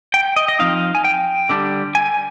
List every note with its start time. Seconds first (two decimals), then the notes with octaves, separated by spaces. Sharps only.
0.14 G5
0.36 D#5
0.48 D#5
0.59 F3 C4 D#4 F5
0.95 G#5
1.04 G5
1.49 D3 G3 D4
1.95 G#5